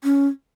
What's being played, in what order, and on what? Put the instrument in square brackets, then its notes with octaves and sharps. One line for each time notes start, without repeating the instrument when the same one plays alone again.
[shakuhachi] C#4